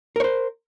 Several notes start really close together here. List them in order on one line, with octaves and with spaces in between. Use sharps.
A#4 C#5 C5